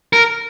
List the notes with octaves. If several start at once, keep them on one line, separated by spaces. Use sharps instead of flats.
A#4